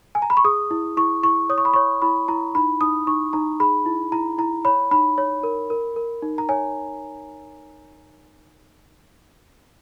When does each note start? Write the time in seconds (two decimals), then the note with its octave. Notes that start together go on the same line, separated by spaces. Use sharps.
0.15 G#5
0.22 A#5
0.30 B5
0.37 C#6
0.44 G#4 D#6
0.71 E4
0.97 E4 C#6
1.23 E4 C#6
1.49 C#5 D#6
1.58 C#6
1.65 B5
1.74 C#5 C#6
2.02 E4 B5
2.28 E4 A#5
2.55 D#4 B5
2.81 D#4 D#6
3.07 D#4 C#6
3.33 D#4 A#5
3.60 G#4 B5
3.86 E4
4.12 E4 A#5
4.38 E4 A#5
4.65 C#5 B5
4.91 D#4 B5
5.18 C#5
5.43 A#4
5.70 A#4
5.96 A#4
6.23 D#4
6.38 A#5
6.49 C#5 G#5